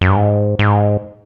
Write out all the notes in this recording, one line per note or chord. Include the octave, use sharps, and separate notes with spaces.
F#2
G2
G#2
G#2